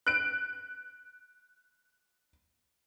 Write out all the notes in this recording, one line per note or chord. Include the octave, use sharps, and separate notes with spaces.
F#6 D7